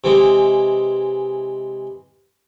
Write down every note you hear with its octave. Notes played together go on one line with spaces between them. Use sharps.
C3 E3 G#3